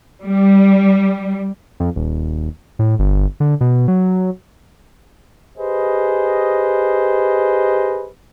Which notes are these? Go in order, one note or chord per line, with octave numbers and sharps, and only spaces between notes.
G3
F2
D#1
A2
G1
D3
B2
F#3
G4 G#4 B4 C5 D#5